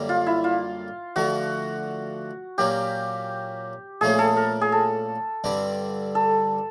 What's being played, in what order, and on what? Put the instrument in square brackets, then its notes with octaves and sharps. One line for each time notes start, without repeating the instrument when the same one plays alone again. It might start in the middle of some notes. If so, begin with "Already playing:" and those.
Already playing: [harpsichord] F#2 D3 G3 A#3
[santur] F4
E4
F4
[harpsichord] D3 F3 A3 [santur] F#4
[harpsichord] A#2 F#3 A#3 C#4 [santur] G4
[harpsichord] A#2 F3 A3 C#4 [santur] G#4
[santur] A4
A#4
G#4
A4
[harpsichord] G2 D3 G3 C4
[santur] A4